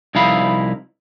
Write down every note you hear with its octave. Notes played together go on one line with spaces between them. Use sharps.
C2 F3 D#4 E4 F5 B5